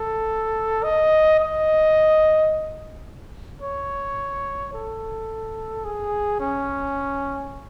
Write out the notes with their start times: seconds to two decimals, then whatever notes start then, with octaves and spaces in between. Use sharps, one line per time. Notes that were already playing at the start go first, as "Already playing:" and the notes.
Already playing: A4
0.84 D#5
1.40 D#5
3.62 C#5
4.74 A4
5.85 G#4
6.40 C#4